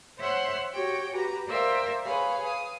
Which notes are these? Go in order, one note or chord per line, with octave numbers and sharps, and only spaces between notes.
C5 C#5 E5 F#5 C6 F#6
F#4 G4 C#5 G5
F#4 G4 B4 A#5
A#4 C5 D5 E5 F5 G5
G#4 B4 C#5 F5
F5 D#6